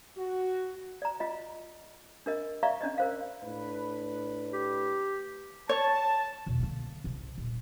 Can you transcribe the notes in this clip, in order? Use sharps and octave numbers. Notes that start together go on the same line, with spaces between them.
F#4
D5 A#5
F4 D#5
D4 A#4 D#5
D5 E5 F5 A#5 C#6
C#4 D4 D5 D#5
A#4 C5 F5
A2 D4 B4
G4
C#5 A5
E2 B2
D3 A#3
C2 C3
D#1